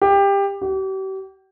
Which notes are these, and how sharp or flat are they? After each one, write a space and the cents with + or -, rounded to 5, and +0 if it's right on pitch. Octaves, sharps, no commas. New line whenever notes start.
G4 +20
G4 -40